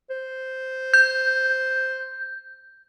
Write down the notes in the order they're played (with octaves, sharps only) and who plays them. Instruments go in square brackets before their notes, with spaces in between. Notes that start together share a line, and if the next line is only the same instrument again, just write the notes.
[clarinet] C5
[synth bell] G6